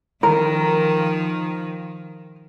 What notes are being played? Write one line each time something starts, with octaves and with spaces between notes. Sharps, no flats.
D#3 F3 A#4